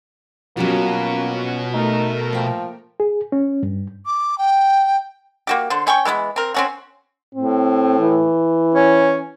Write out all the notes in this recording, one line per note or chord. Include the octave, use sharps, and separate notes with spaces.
B2 F#3 G3 A#3 C#4 F4 F#4
A3 D#4 A#4
F3 A#3 G5
G#4
C#4
G2
D6
G5
A#3 F#4 G4
D3 C5
C#4 C#5 G5 C#6
E3 G#3 A#3 B3
C4 A#4
C4 C#4 F#4
A2 C4
E3
C#4